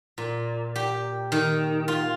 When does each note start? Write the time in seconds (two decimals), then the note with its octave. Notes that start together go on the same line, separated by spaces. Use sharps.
0.18 A#2
0.76 G4
1.32 D#3
1.88 F4